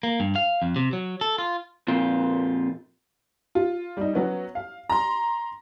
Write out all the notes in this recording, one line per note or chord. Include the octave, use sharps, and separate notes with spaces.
A#3
G2
F5
F2
C3
F#3
A4
F4
F2 A#2 C4 F4
F4
G3 D#4
F#3 B3 C#4
F5
A#5 C6